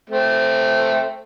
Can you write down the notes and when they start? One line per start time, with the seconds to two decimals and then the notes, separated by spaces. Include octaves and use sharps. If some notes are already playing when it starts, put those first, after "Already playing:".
0.10 A3 C4